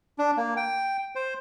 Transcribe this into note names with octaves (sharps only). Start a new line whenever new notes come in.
D4
A#3
G5
C5